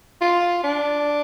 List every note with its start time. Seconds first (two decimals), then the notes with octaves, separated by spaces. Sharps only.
0.21 F4
0.64 D4